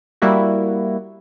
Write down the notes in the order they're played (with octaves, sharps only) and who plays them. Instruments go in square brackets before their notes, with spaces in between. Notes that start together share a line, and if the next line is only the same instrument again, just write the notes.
[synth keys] G3 A#3 E4 F#4